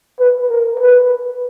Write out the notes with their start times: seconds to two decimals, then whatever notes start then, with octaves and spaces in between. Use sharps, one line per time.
0.20 B4
0.49 A#4
0.80 B4